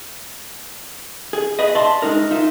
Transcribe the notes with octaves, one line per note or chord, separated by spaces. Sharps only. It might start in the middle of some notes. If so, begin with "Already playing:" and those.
G#4
G#4 B4 D#5
D5 E5 A5 C6
G#3 D4 D#4 A#4
D#4 F4 E5